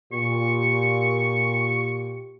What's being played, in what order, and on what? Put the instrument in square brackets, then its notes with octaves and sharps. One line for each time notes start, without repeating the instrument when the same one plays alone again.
[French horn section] A#2 G4 [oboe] C#6